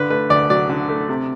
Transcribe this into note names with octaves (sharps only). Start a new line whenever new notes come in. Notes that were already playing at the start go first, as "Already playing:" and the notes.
Already playing: G2 D3 B4
A3 B4
D2 D5
F#3 D5
D3
A3
C3